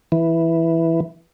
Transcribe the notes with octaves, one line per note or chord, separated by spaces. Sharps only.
E3